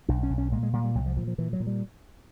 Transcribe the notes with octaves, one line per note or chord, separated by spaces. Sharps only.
B1 D4
C#4
B1
C#4
A#2 G#3
G#3
A#2 G3
G3
C2 F#3
F3
A#2 F3
F3
A#2 E3
F#3
A#2
G3